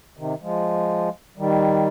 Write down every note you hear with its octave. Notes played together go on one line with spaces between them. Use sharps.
C3 D#3
F3 G#3
D#3 G3